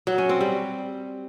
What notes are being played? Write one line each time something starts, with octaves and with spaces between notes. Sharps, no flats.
F#3
C#4
C4
G3